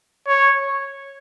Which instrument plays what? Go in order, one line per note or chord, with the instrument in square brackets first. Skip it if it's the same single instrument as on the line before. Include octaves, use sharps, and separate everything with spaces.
[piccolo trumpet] C#5